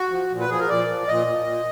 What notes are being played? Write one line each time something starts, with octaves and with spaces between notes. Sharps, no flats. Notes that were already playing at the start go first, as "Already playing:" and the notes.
Already playing: F#4
F3
A#2
B4
F3 G#4
A#4
A#2 D5
F3
A#2 D#5
F3
A#2